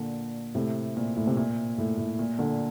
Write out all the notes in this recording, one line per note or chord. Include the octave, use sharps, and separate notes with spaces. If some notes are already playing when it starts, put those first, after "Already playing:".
Already playing: A#2 D3
A2 C3
A#2
A2
C3
A#2
A2
A2
A#2
A#2 D3